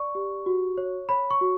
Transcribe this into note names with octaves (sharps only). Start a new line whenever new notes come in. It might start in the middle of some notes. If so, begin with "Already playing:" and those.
Already playing: D5 C#6
G4
F#4
C#5
C#5 B5
C#6
F#4